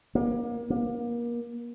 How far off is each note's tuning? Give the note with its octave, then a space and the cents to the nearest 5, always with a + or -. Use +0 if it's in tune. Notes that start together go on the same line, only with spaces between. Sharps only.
A#3 +30
A#3 +30